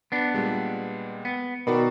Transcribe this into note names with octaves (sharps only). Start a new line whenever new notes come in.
B3 D4
A#2 G3 G#3
B3
B2 D#3 F#4 D5 B5